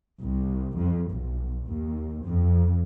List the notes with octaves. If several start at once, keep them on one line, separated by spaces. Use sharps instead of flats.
C2
F2
B1
D#2
F2